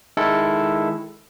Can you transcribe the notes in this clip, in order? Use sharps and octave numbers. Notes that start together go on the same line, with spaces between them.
D#3 G#3 E4 A4